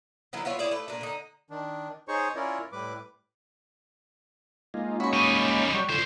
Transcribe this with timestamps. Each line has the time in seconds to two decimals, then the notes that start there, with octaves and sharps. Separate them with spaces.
0.33 D3 D#3 F#3 E4
0.45 B3 E4 F4 C#5
0.59 E4 G#4 C#5 D5
0.71 A3 B4
0.88 A#2 D4
1.01 D3 D#4
1.50 D#3 D4
2.08 D#4 G#4 C5 C#5 C#6
2.36 C#4 E4 F4 A#4 C#5 D5
2.72 A2 G3 B4 D6
4.74 G#3 A#3 D#4 F4
5.00 C#4 D#4 F#4 B5 C#6
5.14 G3 D#5
5.74 F#3 G3 C#6
5.89 C#2 D3 F4 C5